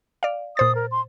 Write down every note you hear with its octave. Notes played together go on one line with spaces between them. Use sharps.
D5 F5
A#2 C5 D#6 A6
A#4
C6